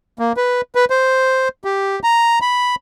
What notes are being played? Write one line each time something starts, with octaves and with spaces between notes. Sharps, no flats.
A#3
B4
B4
C5
G4
A#5
B5